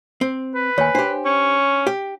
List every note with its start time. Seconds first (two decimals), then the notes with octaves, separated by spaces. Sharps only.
0.21 C4
0.55 B4
0.78 D#2 C#5 G#5
0.95 D4 G4 C5
1.25 C#4 C#6
1.87 G4